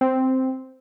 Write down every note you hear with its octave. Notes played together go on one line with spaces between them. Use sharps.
C4